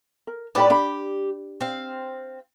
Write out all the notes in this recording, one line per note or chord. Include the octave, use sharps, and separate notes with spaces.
A#4
A2 D#4 G4 B4 D5 B5
D4 G4 D5 B5
C4 F5